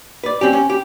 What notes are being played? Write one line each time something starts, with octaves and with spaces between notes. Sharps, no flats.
B4 D5
C4 C#4 G4
C#4
G4